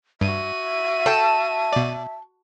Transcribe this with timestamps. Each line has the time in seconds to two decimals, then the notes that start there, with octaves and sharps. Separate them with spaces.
0.21 G2 F#4 E5 D#7
1.06 A4 G5 A5
1.73 B2 D5